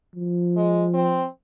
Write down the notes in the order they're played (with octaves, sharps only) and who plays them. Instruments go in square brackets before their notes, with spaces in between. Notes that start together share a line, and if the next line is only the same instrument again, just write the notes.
[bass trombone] F3
[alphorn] G#3
C4